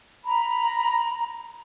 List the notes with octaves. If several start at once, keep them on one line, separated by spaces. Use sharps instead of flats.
A#5 B5